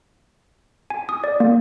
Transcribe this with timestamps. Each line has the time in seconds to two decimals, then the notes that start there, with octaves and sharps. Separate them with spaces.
0.90 G#5
1.09 D#6
1.24 D5
1.40 A#3